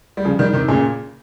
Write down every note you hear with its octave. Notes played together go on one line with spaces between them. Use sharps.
G3
C#3 F3
D#3 G3
C3 D#3
A#2 C#3